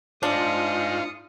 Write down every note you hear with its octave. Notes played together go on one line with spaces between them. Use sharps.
D4 D#4 F4 C5 D#6 C#7